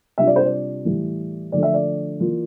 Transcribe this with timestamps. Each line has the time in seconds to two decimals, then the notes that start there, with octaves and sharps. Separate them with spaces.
0.18 C3 G3 D4 F4 E5
0.27 D5
0.36 C5
0.45 D5
0.85 A2 E3 G3
1.52 D3 F3 A3 D4 D5
1.63 E5
1.74 D5
2.20 E3 A#3 F4